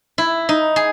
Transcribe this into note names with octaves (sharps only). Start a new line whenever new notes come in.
E4
D#4
G#4